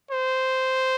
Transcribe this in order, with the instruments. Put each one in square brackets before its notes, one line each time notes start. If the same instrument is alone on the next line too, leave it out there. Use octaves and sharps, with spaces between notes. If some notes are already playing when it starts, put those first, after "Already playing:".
[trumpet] C5